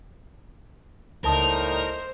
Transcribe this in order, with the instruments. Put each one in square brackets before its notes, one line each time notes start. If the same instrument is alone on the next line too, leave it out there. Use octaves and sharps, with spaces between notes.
[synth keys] C#2 A5 D#6 [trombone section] A2 G3 D#4 [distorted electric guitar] A#4 [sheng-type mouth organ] C5